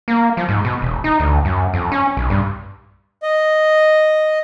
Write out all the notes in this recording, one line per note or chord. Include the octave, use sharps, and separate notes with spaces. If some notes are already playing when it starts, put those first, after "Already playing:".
A#3
F3
G#2
B2
E1
D#4
D2
F#2
F2
C#4
B1
G2
D#5